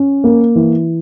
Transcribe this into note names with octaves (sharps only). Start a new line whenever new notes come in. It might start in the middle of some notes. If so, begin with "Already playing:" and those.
Already playing: C#4
A#3
E3